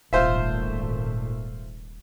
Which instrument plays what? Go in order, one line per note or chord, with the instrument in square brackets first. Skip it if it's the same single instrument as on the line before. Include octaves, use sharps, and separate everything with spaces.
[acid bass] D#1 [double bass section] G#1 A#2 A3 [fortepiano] F4 C5 E5